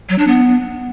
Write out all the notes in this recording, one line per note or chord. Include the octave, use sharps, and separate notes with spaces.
F#3
D4
B3